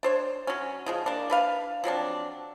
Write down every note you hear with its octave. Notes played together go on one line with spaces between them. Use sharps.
D4 C5 C#5
F#3 C#4
C#3 F3 G#3
A#3 D4
D4 B4 F5
F3 F#3 C4 D4